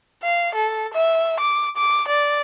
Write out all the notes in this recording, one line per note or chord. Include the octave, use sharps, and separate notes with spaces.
F5
A4
E5
D6
D6
D5